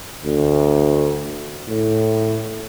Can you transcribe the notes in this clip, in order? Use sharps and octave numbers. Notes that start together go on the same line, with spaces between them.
D2
A2